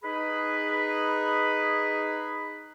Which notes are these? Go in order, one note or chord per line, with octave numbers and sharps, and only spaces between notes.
D#4 G#4 B4 B5